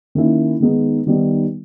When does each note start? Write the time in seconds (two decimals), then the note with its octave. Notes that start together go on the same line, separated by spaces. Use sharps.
0.15 D#3 A#3 C#4 E4
0.61 D#3 G#3 B3 D#4
1.07 D#3 G3 B3 D#4